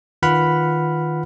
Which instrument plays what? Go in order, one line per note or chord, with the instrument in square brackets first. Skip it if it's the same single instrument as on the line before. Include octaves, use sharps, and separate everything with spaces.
[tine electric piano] D#3 F4 B4 F#5 B5 F6